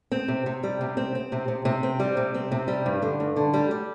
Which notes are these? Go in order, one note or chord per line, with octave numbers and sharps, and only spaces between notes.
C4
C3
C3
G3
C3
C4
C4
C3
C3
C3
C4
G3
C3
C4
C3
G3
G2
D3
G2
D3
G3
G3